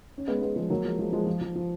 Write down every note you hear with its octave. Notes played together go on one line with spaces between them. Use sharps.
C#4
G#3 B3
G#3 B3
F3 G#3
F#3 A#3
F3 G#3
F3 G#3
F3 G#3
F3
F3
F3